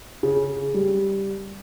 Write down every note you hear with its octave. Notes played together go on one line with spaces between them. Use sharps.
C#3
G3